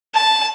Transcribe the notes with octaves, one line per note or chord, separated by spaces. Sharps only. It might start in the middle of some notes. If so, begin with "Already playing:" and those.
A5